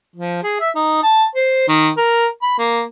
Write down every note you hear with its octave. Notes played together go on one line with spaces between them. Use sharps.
F3
G#4
E5
D#4
A5
C5
D#3
A#4
B5
A#3